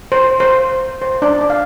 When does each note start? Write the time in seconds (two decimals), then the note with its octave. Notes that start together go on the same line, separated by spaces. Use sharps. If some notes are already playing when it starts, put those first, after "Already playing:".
0.12 C5
0.40 C5
1.02 C5
1.22 D4 D5
1.41 D5
1.50 F5